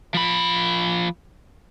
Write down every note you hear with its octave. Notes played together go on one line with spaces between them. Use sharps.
F3 B5